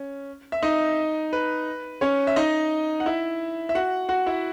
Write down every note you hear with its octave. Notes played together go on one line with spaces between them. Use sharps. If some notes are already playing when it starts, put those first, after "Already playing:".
Already playing: C#4
E5
D#4 D#5
B4
C#4 C#5
E5
D#4 D#5
F#5
E4 E5
E5
F#4 F#5
F#4 F#5
E4 E5